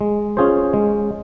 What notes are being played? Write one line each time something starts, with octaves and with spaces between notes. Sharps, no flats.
G#3
C#4 F4 G#4 C5
G#3